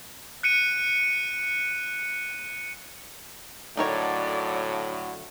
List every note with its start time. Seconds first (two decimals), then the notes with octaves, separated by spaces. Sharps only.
0.43 F#6 C#7 D#7
3.77 A2 D3 F#3 D#4 A#4 C#5 D5